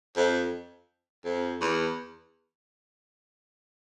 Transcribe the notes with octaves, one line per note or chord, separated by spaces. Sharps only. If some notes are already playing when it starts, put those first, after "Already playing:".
F2
F2
E2